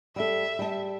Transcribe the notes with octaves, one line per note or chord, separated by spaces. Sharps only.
G3 A4 E5
G3 A5